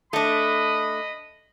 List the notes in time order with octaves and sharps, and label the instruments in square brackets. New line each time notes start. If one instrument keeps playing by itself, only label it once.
[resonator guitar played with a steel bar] A3 D4 [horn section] D#5 B5